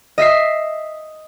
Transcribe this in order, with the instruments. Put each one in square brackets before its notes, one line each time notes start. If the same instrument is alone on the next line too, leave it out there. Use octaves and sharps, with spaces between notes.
[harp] D#5 E5 B6 C7